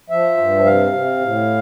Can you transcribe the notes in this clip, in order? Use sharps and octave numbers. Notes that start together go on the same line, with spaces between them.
F3 E5
G2
C3 F5
C3
A2